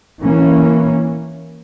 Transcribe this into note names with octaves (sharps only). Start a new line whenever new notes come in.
E3 A#3 C#4